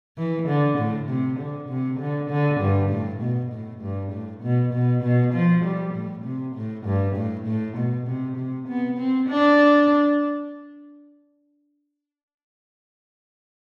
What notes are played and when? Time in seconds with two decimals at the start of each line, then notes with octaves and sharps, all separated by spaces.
0.18 E3
0.48 D3
0.78 A2
1.09 C3
1.39 D3
1.69 C3
1.99 D3
2.30 D3
2.60 G2
2.90 A2
3.21 B2
3.52 A2
3.81 G2
4.12 A2
4.43 B2
4.73 B2
5.03 B2
5.33 F3
5.64 G3
5.94 A2
6.24 C3
6.55 A2
6.85 G2
7.16 A2
7.47 A2
7.77 B2
8.07 C3
8.37 C3
8.68 B3
8.99 C4
9.28 D4